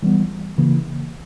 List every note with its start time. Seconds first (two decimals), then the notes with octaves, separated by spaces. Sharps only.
0.03 E3 G3 B3
0.58 C#3 E3 A#3